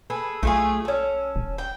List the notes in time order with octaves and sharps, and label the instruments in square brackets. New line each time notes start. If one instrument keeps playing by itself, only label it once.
[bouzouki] G#4 A4 B4
[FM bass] B1 [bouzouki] A3 F4 G#4
[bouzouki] C#4 A4
[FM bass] D#1
[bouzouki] G5